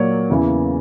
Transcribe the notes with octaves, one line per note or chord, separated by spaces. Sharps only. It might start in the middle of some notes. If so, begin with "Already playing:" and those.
Already playing: A#2 F#3 A#3 C#5 D5
E2 C#3 E3 A#3